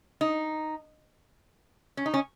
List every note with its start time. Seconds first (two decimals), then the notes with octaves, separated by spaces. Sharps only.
0.21 D#4
1.97 C#4
2.06 D#4
2.14 C#4